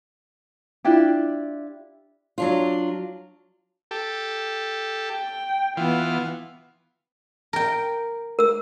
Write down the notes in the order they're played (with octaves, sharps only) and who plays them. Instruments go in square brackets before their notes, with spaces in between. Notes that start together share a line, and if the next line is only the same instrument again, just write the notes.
[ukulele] D4 E4 F4 G4
[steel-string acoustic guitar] F#3 D4 F4
[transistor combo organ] G4 A4
[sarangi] G5
[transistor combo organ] E3 F4 [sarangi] B3
[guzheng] A#4 G5
[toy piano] A#4 E6